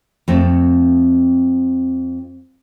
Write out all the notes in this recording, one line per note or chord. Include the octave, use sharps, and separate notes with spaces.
F2 A3 C4